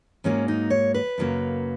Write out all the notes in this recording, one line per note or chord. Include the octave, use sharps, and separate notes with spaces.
G#2 F#3 A#3 C#4
D#4
C#5
B4
F#2 C#3 F#3 A#3